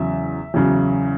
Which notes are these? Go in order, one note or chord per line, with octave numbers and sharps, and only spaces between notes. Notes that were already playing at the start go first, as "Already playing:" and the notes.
Already playing: E2 C#3 F#3 E5
E2 C#3 F#3